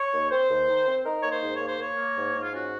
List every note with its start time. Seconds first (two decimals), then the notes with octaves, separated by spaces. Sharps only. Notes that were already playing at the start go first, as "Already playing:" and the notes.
Already playing: C#5
0.12 D#2
0.30 C4 C5
0.49 D#2
0.68 D#3
0.87 C4
1.05 D#4 A#4
1.21 A#3 C#5
1.30 C5
1.41 G#2
1.54 C#5
1.61 A#3
1.67 C5
1.79 A#3 C#5
1.97 A#3
2.16 G#2
2.34 G#2
2.42 F4
2.53 C#4 F#4